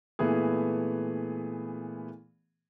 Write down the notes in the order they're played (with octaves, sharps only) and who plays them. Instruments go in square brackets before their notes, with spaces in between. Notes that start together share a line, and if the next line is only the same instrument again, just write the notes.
[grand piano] A#2 E3 A3 B3 G#4